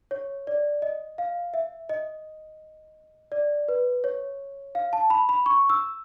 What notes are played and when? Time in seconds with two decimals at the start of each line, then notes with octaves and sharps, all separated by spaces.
0.11 C#5
0.47 D5
0.82 D#5
1.18 F5
1.54 E5
1.89 D#5
3.32 D5
3.68 B4
4.04 C#5
4.75 F5
4.93 A5
5.10 B5
5.29 B5
5.46 C#6
5.70 E6